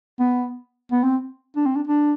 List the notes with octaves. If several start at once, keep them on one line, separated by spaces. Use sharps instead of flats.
B3
B3
C4
D4
C4
D4
D4